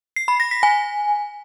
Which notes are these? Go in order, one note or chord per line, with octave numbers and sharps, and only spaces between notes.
C7
B5
A#6
B6
G#5